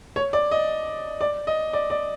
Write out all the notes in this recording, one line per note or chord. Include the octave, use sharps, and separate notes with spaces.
C#5
D5
D#5
D5
D#5
D5
D5